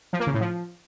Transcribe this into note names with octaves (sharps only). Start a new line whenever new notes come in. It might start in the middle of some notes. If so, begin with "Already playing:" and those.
F3
A#3
C#3
A2
F3